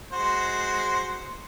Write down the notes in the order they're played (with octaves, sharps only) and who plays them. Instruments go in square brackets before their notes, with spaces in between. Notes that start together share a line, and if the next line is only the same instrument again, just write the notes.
[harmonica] G#3 F#4 C5